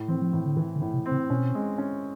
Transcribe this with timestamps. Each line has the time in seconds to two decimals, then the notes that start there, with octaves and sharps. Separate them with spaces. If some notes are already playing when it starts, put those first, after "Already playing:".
Already playing: A2
0.08 E3 C4
0.21 F3
0.33 A2 E3
0.46 D3
0.57 D#3 E3
0.76 D3
0.82 A2
0.94 C3
1.06 C4
1.11 C#3
1.30 B2 C#4
1.55 G#3
1.78 C#4